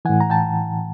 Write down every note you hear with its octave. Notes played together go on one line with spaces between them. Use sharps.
A2 E3 F#5 G#5
A#5
G5 A5